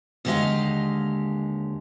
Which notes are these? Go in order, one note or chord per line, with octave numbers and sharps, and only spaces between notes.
D#2 D3 G#3 G4 D#5 F5